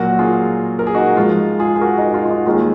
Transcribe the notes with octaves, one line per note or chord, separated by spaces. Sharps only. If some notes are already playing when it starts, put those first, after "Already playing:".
Already playing: A#2 F#3 F#4 A#4
F4 G#4
A#4
G#4
D#4 F#4
G#2 F3 G#3 F4
F4 G#4
G#4
F#4 A#4
D#4
D#4
F4
F4
D#4 F#4
D#2 D#3 G#3 F4 G#4